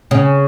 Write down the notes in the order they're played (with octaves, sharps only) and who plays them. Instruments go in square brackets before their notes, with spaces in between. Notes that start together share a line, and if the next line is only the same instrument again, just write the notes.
[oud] C#3